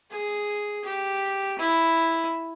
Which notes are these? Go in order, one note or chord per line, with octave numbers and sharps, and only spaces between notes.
G#4
G4
E4